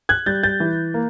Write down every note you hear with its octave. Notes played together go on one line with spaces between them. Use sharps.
F#6 G#6
G3 G6 A6
G6 A6
E3
A#3